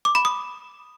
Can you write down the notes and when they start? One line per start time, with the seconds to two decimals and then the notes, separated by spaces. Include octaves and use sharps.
0.05 D6
0.15 B5
0.25 D#6